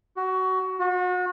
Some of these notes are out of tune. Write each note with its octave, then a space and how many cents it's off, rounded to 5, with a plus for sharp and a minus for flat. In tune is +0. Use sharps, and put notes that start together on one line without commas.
F#4 +20
F#4 -35